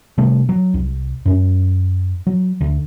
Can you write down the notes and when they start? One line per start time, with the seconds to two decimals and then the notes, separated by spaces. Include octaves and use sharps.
0.18 C3 G3 A3
0.49 F#3
0.74 C2
1.26 F#2 C#4
2.27 F#3
2.61 D2